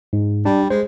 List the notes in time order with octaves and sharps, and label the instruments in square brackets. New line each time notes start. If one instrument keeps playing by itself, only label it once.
[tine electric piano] G#2
[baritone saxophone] G3 [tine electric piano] D4
[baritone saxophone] G#3 [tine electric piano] C5